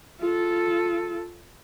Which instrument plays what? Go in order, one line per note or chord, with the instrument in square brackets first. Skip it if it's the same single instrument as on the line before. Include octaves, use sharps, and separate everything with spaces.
[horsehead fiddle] F4 A4